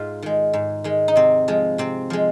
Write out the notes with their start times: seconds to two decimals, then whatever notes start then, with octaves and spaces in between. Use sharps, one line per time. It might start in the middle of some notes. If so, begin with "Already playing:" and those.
Already playing: G#2 G#3 F4
0.22 D#3 G#3
0.53 G#2
0.84 D#3 G#3
1.08 D#4
1.16 C3 C4
1.48 F3 G#3
1.78 C3 C4
2.10 F3 G#3